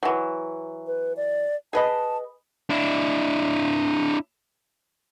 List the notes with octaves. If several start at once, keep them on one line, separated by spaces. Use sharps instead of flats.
E3 F#3
B4
D5
G#4 B4 D#5 A5
D4 E4